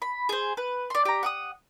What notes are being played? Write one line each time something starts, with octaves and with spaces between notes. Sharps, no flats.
B5
G#4 C5
B4
D5 C6
G4 A#5
F#5 D6 D#6